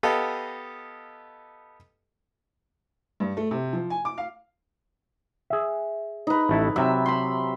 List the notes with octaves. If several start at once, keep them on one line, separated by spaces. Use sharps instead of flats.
B3 G4 A4 D#5 F5
G2
A3
C3
F3
G#5
D6
F5
G#4 E5
D#4 B4
A1 A3 E4
C3 F#3 E5
B5 C6